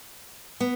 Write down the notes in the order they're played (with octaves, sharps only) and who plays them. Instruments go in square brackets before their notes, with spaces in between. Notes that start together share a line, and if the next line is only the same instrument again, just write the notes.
[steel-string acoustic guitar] B3